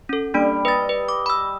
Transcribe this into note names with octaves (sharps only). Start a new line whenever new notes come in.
C#4 A4
G3 A#3 D4 D7
B4 D#5 A6
B4
D6
B5 E6